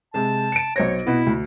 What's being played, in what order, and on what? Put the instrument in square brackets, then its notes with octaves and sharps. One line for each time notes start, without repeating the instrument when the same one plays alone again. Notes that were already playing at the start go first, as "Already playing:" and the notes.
[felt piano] C3 G#3 [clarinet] A5
[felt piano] C#7 D7
[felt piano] B1 C5 A#6 [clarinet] C#5
[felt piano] B2 B3 [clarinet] E4
[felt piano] D2